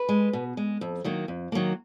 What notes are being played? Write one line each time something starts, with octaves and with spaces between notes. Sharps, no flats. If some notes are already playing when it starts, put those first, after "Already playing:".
Already playing: B4
G#3
B2
G#3
F2
D#3 F#3 A#3
F2
D#3 F#3 A#3